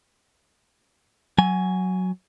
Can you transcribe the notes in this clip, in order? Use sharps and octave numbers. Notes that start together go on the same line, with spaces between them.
F#3 G#5